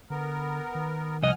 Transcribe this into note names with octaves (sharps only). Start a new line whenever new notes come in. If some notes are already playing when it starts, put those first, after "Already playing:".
D3 B3 A#4
D#3
C2 F3 D#5 F#5 G#5 F6